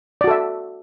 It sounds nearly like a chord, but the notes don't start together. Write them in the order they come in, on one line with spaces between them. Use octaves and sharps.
D5 F#4 A4 E5